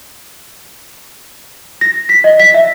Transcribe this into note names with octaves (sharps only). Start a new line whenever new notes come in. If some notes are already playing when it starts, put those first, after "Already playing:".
A#6
B6
D#5
B6
E5